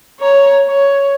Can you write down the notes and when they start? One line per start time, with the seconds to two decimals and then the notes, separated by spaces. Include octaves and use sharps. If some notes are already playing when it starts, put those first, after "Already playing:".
0.20 C#5 A#5
0.68 C#5